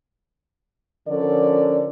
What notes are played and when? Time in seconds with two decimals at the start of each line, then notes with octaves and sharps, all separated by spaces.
1.08 D3 F3 C#4 A4 A#4 D5